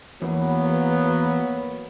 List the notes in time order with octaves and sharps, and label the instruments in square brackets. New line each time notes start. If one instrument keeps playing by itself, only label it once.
[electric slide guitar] E2 [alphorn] F#3 [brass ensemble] A#3 B3